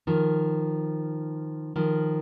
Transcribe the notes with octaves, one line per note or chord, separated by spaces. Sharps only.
D#3 F3
D#3 F3